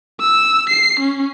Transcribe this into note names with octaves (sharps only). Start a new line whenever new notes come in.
E6
C7
C#4